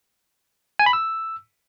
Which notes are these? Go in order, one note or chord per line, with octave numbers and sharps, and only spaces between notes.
G#5
B5
E6